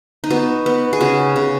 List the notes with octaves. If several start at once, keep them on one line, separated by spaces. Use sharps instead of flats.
D#4
B3 F#4
B3
G#4
C#3 F#4
C#3